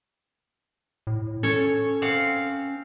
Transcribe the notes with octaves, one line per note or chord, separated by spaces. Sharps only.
A2
C#4 A4 C#5
C4 F5 F#5